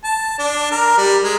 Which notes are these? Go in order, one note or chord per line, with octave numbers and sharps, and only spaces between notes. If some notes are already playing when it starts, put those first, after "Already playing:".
A5
D4
A#4
G3
G#3